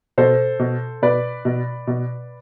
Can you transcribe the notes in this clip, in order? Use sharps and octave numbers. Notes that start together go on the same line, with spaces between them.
B2 A4 C5
B2
B2 B4 D5
B2
B2